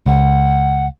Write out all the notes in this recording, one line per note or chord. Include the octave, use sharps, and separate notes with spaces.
C#2 F#5